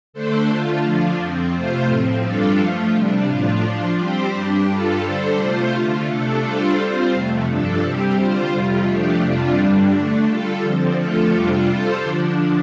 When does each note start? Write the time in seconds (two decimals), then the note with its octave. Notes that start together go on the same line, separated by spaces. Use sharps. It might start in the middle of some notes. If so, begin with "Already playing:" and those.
0.13 D3 A3 D4 A4 C5
0.49 D3 A3 F4
0.83 D3 F3 D4 F4
1.18 F2 F3 C4
1.53 F2 C3 A3 F4 C5
1.88 A2 F3 C4
2.23 G2 G3 D4 F4 A4
2.58 F3 A3 F4
2.94 C3 G3 D4
3.28 A2 F3 D4 F4
3.63 F3 D4 F4
3.97 G3 C4 G4 C5
4.33 G2 G3 D4 G4
4.68 G2 G3 F4 A4
5.03 D3 G3 D4 A4 C5
5.37 C3 A3 F4 C5
5.72 D3 A3 F4
6.08 C3 A3 D4 A4
6.42 G3 D4 F4 A4 C5
6.77 G3 C4 F4 C5
7.12 F2 C3 A3
7.47 G2 F3 D4 A4
7.82 C3 G3 C4 G4
8.17 D3 G3 F4 C5
8.52 F2 C3 G3 F4
8.86 F3 A3 D4 G4
9.21 F2 C3 G3 D4 F4
9.56 G2 D3 G3 D4
9.91 D3 A3 D4
10.26 G3 F4 A4
10.62 D3 F3 C4
10.96 D3 F3 A3 F4 A4
11.30 F2 C3 G3 D4 F4
11.66 G3 F4 A4 C5
12.01 D3 F3 D4